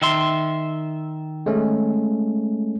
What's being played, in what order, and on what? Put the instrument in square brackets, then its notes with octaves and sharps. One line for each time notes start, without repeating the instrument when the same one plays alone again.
[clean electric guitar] D#3 E5 C6
[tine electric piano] G#3 A3 C#4